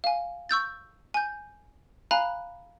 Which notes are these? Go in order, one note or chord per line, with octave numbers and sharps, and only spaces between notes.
F5 G#5
C#6 E6 G6 A6
G#5 G6
F5 G#5 A#5 B5 F#6